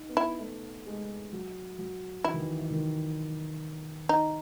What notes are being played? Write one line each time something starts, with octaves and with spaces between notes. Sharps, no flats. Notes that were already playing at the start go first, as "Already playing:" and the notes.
Already playing: D#4
B3
E4
A3
G#3
F#3
F#3
E3 E4
D#3
E3
E3
D#3
D#4